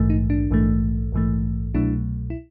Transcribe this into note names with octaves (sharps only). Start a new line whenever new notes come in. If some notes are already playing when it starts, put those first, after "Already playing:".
Already playing: A#1 G#2 E3 A3
D#4
D4
A#1 G#2 E3 A3
A#1 G#2 E3 A3
C2 B2 F#3 A3 D4 E4
E4